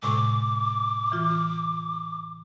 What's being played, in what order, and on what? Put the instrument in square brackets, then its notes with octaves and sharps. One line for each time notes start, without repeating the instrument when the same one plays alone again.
[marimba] A2 C3 G#3 [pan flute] D6
[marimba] E3 F4